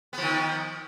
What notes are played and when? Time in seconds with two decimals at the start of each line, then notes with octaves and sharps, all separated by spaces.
0.13 B3
0.18 F3
0.23 D#3